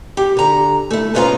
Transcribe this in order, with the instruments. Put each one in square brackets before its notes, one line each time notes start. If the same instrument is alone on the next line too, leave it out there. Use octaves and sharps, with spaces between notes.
[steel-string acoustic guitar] G4
D3 A#5
A3 E4
G#2 B3 C#4 F4 F5 A#5